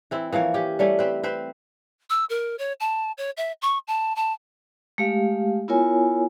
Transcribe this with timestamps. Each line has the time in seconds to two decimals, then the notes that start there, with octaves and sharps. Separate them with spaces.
0.11 E3 C4 E4
0.33 E3 F3 A#3 C#5
0.54 C#4 G4
0.79 G3 A3 C#4
0.99 C4 B4
1.23 C4 B4 C5
2.10 E6
2.29 A#4
2.59 C#5
2.80 A5
3.18 C#5
3.37 E5
3.62 C#6
3.87 A5
4.16 A5
4.98 G#3 A3 G4 F5
5.68 B3 E4 F4 A#4 C#5 G#5